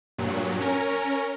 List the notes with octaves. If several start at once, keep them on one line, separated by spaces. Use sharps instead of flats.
G2 A#2 F#3
C#4 A#4